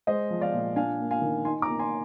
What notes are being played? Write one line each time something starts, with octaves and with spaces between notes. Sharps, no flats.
G#3 C5 D#5
F3
D5 F5
A#2
D4 F5 G#5
A#3
F5 G#5
D#3
D#4 G#5 C6
A#5 D6
A#3
G#5 C6